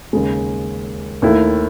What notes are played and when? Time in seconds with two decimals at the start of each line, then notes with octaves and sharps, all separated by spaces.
0.13 D#2 C#3 G#3
1.22 D#2 D#3 A3 E4